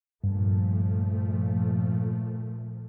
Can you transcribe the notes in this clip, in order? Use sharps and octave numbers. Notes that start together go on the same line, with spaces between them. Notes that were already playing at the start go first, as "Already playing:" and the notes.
G2 A#2 F3 A3